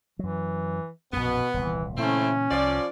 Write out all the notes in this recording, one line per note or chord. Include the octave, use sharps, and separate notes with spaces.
F#2 E3 F#3
A#1 F#2 B2 B3
D#1 C2 A#2 E3
A#2 C#3 E3 A3 C4 C#4 E4
C2 F3 D5